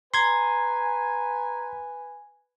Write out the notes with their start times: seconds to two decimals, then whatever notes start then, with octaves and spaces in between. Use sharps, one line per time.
0.14 B4 G#5 A#5 C6 G#6